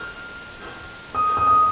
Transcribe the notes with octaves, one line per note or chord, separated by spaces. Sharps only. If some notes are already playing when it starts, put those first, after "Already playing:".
Already playing: F6
D#6
D#6
D#6